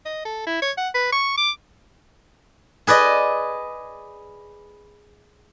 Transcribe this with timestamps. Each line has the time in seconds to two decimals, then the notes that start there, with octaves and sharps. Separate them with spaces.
0.06 D#5
0.25 A4
0.46 E4
0.62 C#5
0.77 F#5
0.94 B4
1.12 C#6
1.38 D6
2.87 G#4 B4 D5 D#5